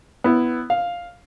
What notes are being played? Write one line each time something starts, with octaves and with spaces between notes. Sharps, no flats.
B3 E4
F5